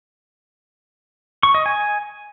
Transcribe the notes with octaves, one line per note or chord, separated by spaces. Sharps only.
C#6
D#5
G#5